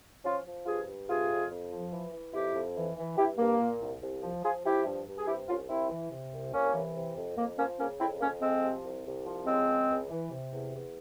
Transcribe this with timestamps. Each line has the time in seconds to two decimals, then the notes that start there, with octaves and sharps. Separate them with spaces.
0.24 F3 C#4 F4
0.46 F3
0.66 G2 F4 G#4
0.87 G2
1.08 C3 F4 G#4
1.29 F2
1.50 F2
1.72 F3
1.92 E3
2.13 E3
2.34 F2 E4 G4
2.55 F2
2.76 E3
2.97 E3
3.17 G2 E4 G4
3.38 G2 A#3
3.60 A#2
3.81 C2
4.01 C2
4.23 F3
4.44 F3 F4 G#4
4.65 F3 E4 G4
4.85 G2
5.06 G2
5.17 G#4
5.27 C3 E4 G4
5.48 C2 C#4 F4
5.69 C2 C4 E4
5.90 E3
6.12 C3
6.33 C2
6.53 C2 A#3 C#4
6.75 E3
6.95 C3
7.16 F2
7.37 F2 A#3
7.58 F3 A#3 C#4
7.79 C#3 A#3 C#4
8.00 F2 C4 E4
8.21 F2 A#3 C#4
8.42 F3 G#3 C4
8.63 C3
8.85 C2
9.05 C2
9.26 F3
9.47 C#3 G#3 C4
9.67 C#2
9.89 C#2
10.10 E3
10.31 C3
10.51 E2
10.73 E2